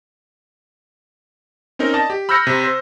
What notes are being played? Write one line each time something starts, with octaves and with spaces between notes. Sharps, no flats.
C4 C#4 D#4 A#4
D5 D#5 A5
G4
B5 E6 F6 G6 A#6 C#7
C3
C5